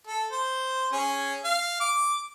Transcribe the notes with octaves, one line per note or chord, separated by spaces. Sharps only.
A4
C5
C#4 G#4
F5
D6